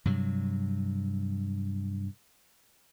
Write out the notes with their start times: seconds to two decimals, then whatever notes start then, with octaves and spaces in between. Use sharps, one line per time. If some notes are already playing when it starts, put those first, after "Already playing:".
0.05 G2 C3 F#3